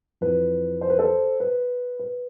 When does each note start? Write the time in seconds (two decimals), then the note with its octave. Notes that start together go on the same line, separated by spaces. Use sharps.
0.21 F2 E3 B4
0.81 C5
0.90 B4
0.99 A4 C5
1.40 B4
1.99 B4